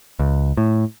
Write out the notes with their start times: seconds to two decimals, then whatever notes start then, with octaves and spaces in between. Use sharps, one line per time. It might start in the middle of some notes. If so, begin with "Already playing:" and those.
0.19 C#2
0.57 A2